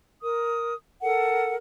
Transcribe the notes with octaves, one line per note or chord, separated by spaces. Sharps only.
A#4 D#6
A4 A#4 F#5